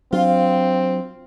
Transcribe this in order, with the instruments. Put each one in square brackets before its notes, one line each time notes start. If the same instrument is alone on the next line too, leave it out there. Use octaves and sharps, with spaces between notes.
[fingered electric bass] F#3 D4 [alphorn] C4 [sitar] F4